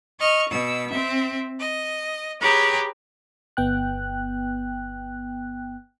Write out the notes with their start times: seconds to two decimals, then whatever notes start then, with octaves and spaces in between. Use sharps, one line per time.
0.20 D#5 C#6 F6
0.50 B2 E6
0.90 C4 E5
1.61 D#5
2.41 G4 G#4 B4 C#5 A#5
3.57 G1 B3 G5 F#6